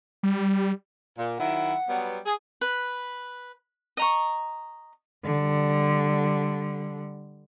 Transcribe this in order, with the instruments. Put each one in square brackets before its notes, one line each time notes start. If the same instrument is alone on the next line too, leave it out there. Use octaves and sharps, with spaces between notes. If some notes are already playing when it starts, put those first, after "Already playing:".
[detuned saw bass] G3
[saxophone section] A#2
[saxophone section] D#3 F#3 E4 [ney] F#5
[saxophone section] F#3 G3 B3
G#4
[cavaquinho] B4
D#5 A#5 C#6
[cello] D3 G3